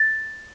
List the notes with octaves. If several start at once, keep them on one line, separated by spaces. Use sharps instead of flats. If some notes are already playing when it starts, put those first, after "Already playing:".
Already playing: A6